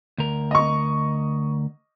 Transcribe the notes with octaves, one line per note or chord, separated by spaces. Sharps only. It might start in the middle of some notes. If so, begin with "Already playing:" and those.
D2 A#4
D#5 C#6